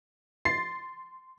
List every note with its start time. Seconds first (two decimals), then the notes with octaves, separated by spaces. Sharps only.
0.45 C6 A6 C7